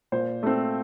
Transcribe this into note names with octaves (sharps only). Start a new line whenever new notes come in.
A#2 C5
A3 C4